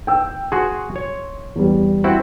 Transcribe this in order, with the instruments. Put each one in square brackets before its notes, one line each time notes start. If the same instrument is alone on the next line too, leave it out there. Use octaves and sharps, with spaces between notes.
[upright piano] G5 E6
[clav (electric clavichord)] F#4 G#4 [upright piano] C6
[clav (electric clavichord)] C#5
[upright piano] E2 G3
[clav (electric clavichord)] C4 E4 F#4